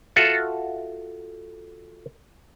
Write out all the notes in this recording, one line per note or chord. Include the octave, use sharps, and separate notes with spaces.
F4 F#4 A4 E5 F#5